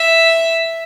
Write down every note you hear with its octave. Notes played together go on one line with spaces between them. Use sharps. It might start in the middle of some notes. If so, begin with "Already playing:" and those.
Already playing: E5